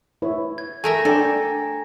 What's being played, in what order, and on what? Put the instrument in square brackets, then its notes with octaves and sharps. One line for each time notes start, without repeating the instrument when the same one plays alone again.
[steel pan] E4 B4 C#5
[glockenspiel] G#6
[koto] A3 A#4 E5 [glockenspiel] G#5 A#5 A#6
[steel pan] D4 D5 G5 [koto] A4